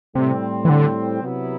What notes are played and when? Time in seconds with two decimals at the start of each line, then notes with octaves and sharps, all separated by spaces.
0.15 A2 C3 G3 C4
0.65 E3
0.69 D3
1.22 C3 F#3 B3 E4